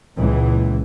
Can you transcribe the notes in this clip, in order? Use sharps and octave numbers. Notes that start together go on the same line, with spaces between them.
C#2 A#2 E3